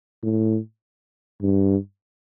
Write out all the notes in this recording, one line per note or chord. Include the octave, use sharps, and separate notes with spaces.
A2
G2